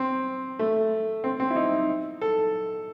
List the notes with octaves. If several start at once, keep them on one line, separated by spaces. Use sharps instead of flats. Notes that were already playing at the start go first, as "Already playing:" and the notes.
Already playing: C4
A3
C4
C4
E4
D#4
A4